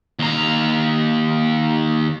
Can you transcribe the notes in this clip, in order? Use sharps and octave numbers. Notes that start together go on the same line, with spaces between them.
D#2 A#5